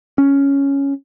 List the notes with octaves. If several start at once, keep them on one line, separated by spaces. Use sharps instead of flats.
C#4